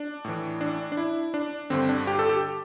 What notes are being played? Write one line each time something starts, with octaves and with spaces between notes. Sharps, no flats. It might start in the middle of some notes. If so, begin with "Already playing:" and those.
Already playing: D4
A2 E3
D4
D4
E4
D4
G2 D3 C4
D4
G4
A4
G4